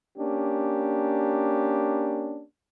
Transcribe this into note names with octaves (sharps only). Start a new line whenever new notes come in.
A#3 C#4 D4 G4